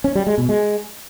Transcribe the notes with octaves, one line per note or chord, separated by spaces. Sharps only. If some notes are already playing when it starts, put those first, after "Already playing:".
C#4
G3
G#3
B2
G#3